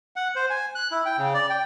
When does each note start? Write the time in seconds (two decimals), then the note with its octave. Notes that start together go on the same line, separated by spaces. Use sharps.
0.16 F#5
0.36 C5
0.50 G#5
0.75 F#6
0.92 E4
1.06 G5
1.18 C#3
1.34 D5
1.50 G5